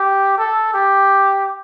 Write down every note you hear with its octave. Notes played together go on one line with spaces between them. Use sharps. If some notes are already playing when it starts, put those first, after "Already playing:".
Already playing: G4
A4
G4